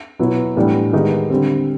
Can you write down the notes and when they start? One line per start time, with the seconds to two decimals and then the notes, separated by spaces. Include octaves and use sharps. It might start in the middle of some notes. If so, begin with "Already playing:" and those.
0.19 B2 F#3 B3 E4
0.56 A2 E3 G3 B3 D4
0.93 D#3 G#3 B3 D#4 G4
1.30 D3 G3 C4